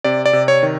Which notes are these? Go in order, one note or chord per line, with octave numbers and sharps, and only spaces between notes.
C3 D5
D5
C3
C#5
D#3